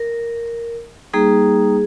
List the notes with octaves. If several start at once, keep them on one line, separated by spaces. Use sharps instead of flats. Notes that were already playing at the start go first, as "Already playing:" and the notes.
Already playing: A#4
G3 A#3 D#4 G#4